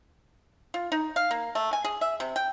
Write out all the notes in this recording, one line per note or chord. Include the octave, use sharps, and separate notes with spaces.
F4
D#4
F5
A#3
A3
G#5
G#4
E5
C3
G5